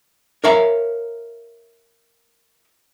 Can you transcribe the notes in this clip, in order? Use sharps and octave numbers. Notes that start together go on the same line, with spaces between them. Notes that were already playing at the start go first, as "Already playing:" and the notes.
A#4 C#5 E5 F5 A#5 B5